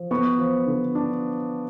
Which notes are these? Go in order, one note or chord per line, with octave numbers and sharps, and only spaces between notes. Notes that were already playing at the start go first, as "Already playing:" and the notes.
Already playing: F3
B3 C#6
F3
D3
D4